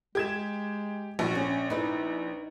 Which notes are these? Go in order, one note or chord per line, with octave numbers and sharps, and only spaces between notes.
G#3 G4 G#6 E7
A#1 F#4
C#4
D#4 E4 B4